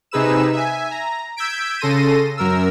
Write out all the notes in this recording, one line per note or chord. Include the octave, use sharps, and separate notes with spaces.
C3 D#4 G#4 B4 E6 E7
E5 G#5
A#5
E6 G6 G#6 B6 D7
C#3 A4 C6 A#6 D#7
F#2 A#4 E6